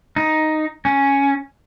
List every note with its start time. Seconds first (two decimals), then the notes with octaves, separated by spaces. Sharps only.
0.16 D#4
0.85 C#4